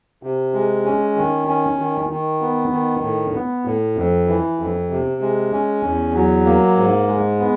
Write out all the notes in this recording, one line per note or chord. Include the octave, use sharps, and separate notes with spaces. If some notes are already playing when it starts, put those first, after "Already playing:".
C3
G#3
C#4
D#3
C#4
D#3
D#3
B3
D#3
A2
B3
A2
F2
E3
F2
C3
G#3
C#4
E2
F#3
A#3
G#2
G#3
B3